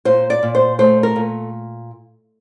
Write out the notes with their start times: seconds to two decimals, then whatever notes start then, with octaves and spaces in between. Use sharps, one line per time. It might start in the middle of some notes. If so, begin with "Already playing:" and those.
0.05 A#2 C5
0.30 D5
0.43 A#2
0.55 C5
0.79 A3 C5
1.03 A#4
1.16 A#2